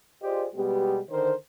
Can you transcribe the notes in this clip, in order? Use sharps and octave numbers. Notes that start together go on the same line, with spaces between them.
F4 G4 G#4 C5 D5 D#5
B2 G3 G#3 B3 G4
D3 D#3 A#4 C5